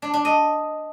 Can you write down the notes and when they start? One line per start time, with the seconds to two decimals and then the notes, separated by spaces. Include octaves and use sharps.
0.02 D4
0.14 D4
0.25 D#5